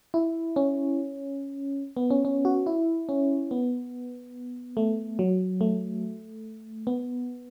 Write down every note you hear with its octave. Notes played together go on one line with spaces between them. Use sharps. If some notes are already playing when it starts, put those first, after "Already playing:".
E4
C#4
B3
C#4
C#4
F#4
E4
C#4
B3
A3
F#3
A3
B3